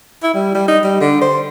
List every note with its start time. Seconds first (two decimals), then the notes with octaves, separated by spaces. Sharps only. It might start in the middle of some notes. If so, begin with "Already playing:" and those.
0.23 E4
0.34 G3
0.55 G3
0.68 D#4
0.84 G3
1.01 D3
1.21 C5